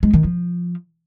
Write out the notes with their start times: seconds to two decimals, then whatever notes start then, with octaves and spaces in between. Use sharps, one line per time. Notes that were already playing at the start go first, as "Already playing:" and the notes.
0.03 G#3
0.13 D#3
0.24 F3